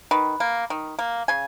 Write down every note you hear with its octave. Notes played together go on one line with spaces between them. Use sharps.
D#3 B4
A#3
D#3
A#3
C#3 G#5